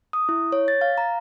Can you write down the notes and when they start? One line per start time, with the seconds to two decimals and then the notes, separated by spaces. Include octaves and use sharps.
0.13 D#6
0.29 E4
0.52 C#5
0.68 A6
0.81 F5
0.98 A#5